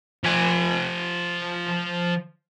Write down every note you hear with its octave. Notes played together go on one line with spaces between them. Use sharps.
F3 G#5